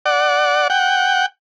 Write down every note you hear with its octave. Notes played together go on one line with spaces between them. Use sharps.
D5 F#5
F#5 G5